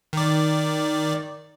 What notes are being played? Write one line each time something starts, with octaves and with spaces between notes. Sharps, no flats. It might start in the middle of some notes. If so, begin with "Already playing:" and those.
D#3 D5